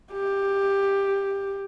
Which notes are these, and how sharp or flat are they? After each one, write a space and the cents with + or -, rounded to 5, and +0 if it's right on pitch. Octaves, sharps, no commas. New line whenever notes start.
G4 +10